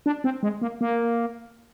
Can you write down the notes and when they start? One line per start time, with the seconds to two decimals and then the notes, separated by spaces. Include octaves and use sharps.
0.06 D4
0.24 C4
0.43 G#3
0.62 A#3
0.81 A#3